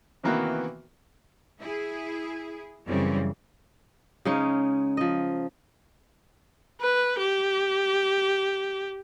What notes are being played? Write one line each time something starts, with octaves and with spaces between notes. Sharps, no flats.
C3 D#3 E3 A#3 B3 F#4
E4 G#4
F#2 C#3 E3 G3 C4
C#3 G#3 C#4 D#4
F3 D#5
B4
G4